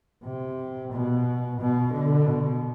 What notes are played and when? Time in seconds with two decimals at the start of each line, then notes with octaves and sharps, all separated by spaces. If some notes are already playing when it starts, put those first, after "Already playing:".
0.24 C3
0.92 B2
1.60 B2
1.93 D3
2.27 B2